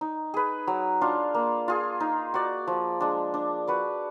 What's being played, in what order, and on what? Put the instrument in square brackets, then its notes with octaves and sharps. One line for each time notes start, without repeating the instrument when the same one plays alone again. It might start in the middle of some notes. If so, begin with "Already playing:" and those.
[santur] D#4
G#4 B4
F#3
D4 F4
A#3
F4 G#4
D#4
F#4 D5
F3
G#3 D4
D4
F#4 B4 D5